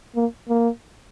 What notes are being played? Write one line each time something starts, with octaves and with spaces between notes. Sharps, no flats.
A#3
A#3